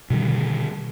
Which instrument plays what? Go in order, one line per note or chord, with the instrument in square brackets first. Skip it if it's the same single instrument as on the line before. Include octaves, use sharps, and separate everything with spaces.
[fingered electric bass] B2 D3 D#3 G3